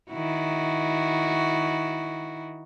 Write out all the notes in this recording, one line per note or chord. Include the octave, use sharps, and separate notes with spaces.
D#3 E4 F#4